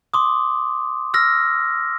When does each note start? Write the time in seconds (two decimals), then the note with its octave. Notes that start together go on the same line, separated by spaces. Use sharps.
0.14 C6 D6 D#6
1.14 E6 F6 A#6